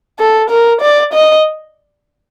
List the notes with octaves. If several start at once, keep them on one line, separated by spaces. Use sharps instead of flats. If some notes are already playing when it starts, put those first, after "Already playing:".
A4
A#4
D5
D#5